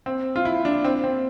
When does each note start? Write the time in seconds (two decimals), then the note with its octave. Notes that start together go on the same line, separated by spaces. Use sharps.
0.06 C4
0.36 F4
0.45 E4
0.65 D4
0.84 C4
1.04 C4